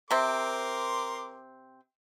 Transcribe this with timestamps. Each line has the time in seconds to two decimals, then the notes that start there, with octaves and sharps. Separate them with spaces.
0.11 C3 C4 A#4 C6 D6